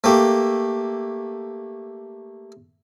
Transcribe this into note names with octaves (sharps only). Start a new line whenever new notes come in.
A3 A#3 G4